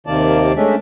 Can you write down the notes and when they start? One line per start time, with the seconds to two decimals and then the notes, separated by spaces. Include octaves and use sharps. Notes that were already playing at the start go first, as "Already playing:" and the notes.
0.07 D#2 C3 D#3 A#3 D5 A5
0.56 G#3 A3 C#4 D4 E5